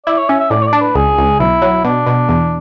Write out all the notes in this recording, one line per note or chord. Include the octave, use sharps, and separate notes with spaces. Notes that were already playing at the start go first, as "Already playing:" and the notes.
E4 D5
C#5
C#4 E5
E5
A2 D5
C#5
D5
D4
B4
C#2 G#4
C#2
B1 E4
F#3
B2 D4
B2
E2